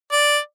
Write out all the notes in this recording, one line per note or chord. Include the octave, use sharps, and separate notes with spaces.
D5